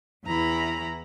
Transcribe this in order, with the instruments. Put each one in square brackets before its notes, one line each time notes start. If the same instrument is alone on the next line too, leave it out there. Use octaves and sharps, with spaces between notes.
[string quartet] E2 E3 E4 A#5 B5